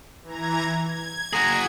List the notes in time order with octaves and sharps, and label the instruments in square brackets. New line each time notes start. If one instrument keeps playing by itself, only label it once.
[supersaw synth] E3 A#5 G#6
G#6
[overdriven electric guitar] F#4 G#4 [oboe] A#5